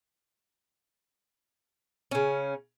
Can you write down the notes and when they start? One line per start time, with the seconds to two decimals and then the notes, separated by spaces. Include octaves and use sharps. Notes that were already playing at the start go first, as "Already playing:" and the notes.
2.11 C#3 C#4